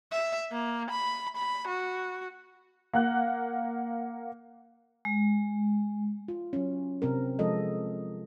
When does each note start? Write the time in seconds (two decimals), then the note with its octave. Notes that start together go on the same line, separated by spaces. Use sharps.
0.12 E5
0.52 A#3
0.90 B5
1.36 B5
1.67 F#4
2.93 A#3 F#5 F#6
5.05 G#3
6.28 F4
6.53 F#3 C#4
7.02 C3 C4 A#4
7.39 F3 G#3 F4 A4 D#5